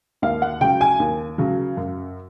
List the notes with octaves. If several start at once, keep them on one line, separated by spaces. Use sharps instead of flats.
D#2 F5
F#5
C#3 F#3 G5
G#5
D#2
C#3 F#3
F#2